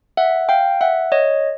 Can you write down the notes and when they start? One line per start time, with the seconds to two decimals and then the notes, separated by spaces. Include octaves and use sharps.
0.17 E5 F#5
0.49 F5 G5
0.81 E5 F#5
1.12 C#5 D#5